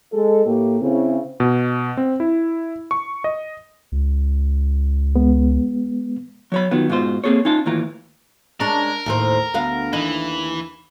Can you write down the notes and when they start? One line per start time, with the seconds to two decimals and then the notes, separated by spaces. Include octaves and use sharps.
0.13 G#3 A4
0.46 A2 A#3 G4
0.81 C#3 C4 E4
1.40 B2
1.97 C4
2.20 E4
2.91 C#6
3.24 D#5
3.92 C#2
5.16 G#3 B3
6.52 F#3 C#5 B5
6.71 D#3 F#3 B3 F4
6.89 G#2 B2 F4 C5
7.24 A#3 C4 G#4 A4 C#5
7.45 C#4 D#4 F4 A5
7.66 D#2 A2 E3 F4 A#5
8.60 G#3 C#4 D4 A#4
9.06 D#2 A2 C5
9.54 D2 B3 F5
9.93 D#2 E3 D#5